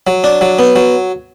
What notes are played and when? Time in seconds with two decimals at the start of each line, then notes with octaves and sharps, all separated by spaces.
0.07 F#3
0.24 D4
0.41 F#3
0.59 B3
0.76 F#3